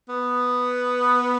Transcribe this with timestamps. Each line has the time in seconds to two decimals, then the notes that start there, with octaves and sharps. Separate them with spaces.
0.09 B3